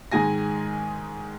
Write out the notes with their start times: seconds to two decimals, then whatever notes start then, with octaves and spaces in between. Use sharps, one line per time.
0.12 G#2 D#3 G#3 G#5 A#6